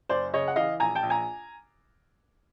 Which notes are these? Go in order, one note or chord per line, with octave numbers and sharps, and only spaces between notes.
F#1 C5 D5
C#3 C#5 D#5
F#5
E3 D#5 F5
A#1 G#5 A#5
G5 A5
A#1
G#5 A#5